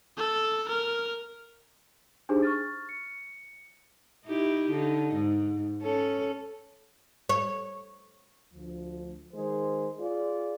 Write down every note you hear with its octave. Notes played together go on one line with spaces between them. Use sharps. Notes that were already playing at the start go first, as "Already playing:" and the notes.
A4
A#4
D4 D#4 G4 G#4 C5
C#6 F6 A6
C#7
D#4 E4 G4
D3 D#4
G#2
C#4 A4
C#5
D2 F3
D#3 G#3 G#4 C5
F4 G#4 D5